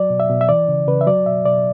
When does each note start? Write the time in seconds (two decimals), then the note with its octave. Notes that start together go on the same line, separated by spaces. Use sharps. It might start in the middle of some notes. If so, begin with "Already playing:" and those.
Already playing: F#3 D5
0.10 B2
0.20 E5
0.30 B2
0.41 E5
0.49 E3 D5
0.68 C#3
0.87 C#3 B4
1.01 E5
1.07 F#3 D5
1.26 B2 E5
1.46 B2 D5